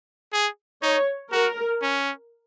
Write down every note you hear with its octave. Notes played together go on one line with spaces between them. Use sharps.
G#4
D#4 C#5
F#4 A#4
C#4